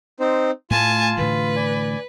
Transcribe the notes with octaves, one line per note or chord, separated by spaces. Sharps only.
C4 D#4 C5
A2 A3 F4 G#5 A5
A2 D3 E3 B4
D5 G#5